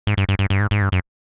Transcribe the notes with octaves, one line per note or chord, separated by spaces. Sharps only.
G#2
G2
G2
G2
G2
G#2
G#2
G2
F#2